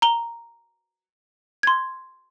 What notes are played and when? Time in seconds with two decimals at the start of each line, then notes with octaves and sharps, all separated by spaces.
0.02 A#5 G7
1.63 C6 G#6